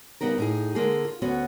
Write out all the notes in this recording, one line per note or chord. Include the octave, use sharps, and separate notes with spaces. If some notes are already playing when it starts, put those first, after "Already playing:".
C#3 G3 B3 D#4 A#4
A2 D#4 G#4
D3 G#3 A#3 G#4
F4
D2 B3 C#4 F#4 C#5